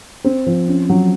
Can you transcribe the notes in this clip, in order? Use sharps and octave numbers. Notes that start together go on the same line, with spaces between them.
C4
F3
C#4
F#3